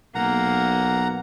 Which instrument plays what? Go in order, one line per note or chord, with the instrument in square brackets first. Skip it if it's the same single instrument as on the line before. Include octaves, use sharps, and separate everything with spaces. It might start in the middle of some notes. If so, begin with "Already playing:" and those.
[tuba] B1 [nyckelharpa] A#3 [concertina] F#5 A#5